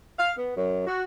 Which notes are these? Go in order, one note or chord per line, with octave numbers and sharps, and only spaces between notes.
F5
B3
F#2
F#4